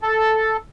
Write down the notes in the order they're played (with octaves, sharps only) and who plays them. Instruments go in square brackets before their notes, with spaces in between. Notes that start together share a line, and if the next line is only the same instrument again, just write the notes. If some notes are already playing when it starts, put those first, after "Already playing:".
[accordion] A4